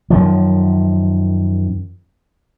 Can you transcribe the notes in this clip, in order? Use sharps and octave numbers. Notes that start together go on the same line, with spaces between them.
F#2 D#3 F3